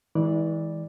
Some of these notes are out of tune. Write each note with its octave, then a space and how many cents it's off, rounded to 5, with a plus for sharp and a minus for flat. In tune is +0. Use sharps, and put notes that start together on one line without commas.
E3 -35 G#3 +0 D5 +0